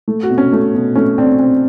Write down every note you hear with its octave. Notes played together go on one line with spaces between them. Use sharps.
A3
F#4
B2
C#4
A3
B2
A3 C#4
C4 D4
C4